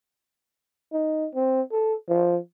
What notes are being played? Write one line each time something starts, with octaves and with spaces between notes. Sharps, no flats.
D#4
C4
A4
F3